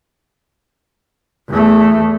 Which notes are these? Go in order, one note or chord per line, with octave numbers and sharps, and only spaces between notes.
E2 A3